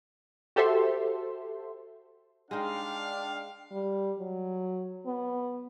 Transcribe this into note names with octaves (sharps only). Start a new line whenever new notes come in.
F#4 G4 A4 C5 E5 C6
G#3 D4 D#4 F5 G5 F6
G3
F#3
B3